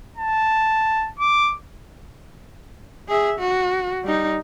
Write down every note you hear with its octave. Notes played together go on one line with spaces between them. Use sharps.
A5
D6
G#4 E5
F#4
G3 D#4